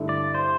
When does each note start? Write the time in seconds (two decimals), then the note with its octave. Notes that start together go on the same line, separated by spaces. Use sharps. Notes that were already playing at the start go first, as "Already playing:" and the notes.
Already playing: G2 D3 A3 E4
0.09 D5
0.35 C5